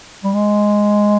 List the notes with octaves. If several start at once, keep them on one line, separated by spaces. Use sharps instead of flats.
G3
G#3